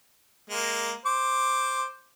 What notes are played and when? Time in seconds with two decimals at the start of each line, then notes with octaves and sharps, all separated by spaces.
0.50 G#3 A#3
1.06 C5 D6